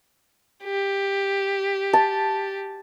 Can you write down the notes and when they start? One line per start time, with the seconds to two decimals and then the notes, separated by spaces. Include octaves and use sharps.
0.64 G4
1.93 A5